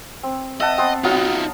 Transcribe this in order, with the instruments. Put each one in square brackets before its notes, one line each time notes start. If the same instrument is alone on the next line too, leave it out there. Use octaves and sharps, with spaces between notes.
[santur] C4
[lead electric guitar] D#5 [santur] E5 F#5 A5
[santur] B3 C4 C5
[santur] F#3 B3 F5 [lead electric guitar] D#4 F4